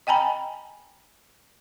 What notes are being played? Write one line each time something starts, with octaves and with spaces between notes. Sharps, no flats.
D#5 G5 G#5 A#5 B5